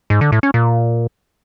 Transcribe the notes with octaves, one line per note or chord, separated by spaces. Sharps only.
G#2
D3
A2
C#4
A#2